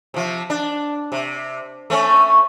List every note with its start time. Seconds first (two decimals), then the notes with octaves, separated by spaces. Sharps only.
0.14 C3 F3
0.50 D4
1.12 C3
1.90 A3 C4 C#4